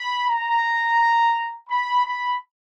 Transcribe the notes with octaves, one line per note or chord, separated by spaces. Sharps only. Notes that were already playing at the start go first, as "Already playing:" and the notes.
Already playing: B5
A#5
B5
B5